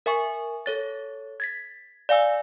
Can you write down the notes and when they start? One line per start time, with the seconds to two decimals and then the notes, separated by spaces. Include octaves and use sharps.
0.06 A#4 E5 G#5 C#6
0.66 A4 C#5 A6
1.40 G#6 A6 B6
2.09 D5 F5 G#5 E6